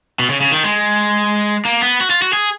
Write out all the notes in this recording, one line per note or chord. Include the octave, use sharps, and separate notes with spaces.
B2
C#3
C#3
D#3
G#3
A#3
B3
F#4
F4
F#4
G#4